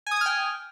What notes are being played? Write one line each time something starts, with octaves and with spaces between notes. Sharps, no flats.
G5 G#5 D#6 F6 G#6